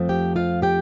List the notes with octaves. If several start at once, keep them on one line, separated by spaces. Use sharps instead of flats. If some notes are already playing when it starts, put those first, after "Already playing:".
Already playing: F2 F3 A3 C4
G4 G5
F4 F5
G4 G5